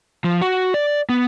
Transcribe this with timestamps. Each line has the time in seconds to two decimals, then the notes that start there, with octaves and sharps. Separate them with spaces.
0.24 F3
0.41 F#4
0.74 D5
1.09 B3